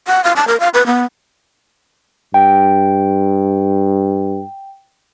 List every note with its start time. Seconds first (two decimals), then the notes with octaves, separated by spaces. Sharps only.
0.07 F#5
0.24 F5
0.36 A5
0.48 A#4
0.60 F5
0.74 B4
0.87 B3
2.34 G2 G5